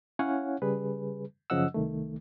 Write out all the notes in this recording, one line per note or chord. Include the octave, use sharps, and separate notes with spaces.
C#4 E4 C#5 F5 F#5 G#5
C#3 G3 G#4 B4
F#2 C#3 F3 D#5 F#5 E6
C2 D#3 A3